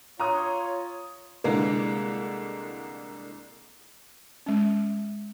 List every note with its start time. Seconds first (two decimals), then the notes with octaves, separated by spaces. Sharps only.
0.20 F4 C#5 A#5 D#6
1.44 C2 D3 E3 G#3 A#3
4.46 G#3 C#4